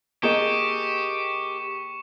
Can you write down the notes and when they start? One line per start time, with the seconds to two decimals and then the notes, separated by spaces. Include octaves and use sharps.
0.23 A#3 G4 G#4 D#5 C#6 C#7 E7